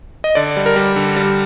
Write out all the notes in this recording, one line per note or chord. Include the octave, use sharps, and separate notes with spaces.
D#5
D3 D5
G3
A#4
G3
D3
G3